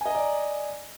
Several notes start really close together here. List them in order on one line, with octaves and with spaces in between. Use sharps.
G#5 D#5 A#5 D5